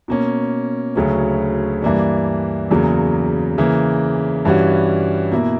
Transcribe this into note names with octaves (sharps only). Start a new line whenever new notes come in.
B2 A#3 C#4
D2 C#3 F#3 C#4
G2 E3 A#3 D4
E2 C#3 F#3 A#3
C#3 E3 A#3
G2 E3 G3 C#4 F#4
B2 A#3 E4